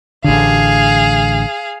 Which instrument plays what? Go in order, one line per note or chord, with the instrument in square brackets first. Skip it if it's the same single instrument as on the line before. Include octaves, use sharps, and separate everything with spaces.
[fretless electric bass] A1 D3 [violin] G#4 F5